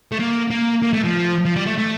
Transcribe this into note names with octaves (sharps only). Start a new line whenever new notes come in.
A3
A#3
A#3
A#3
A3
F3
F3
G3
A3
A3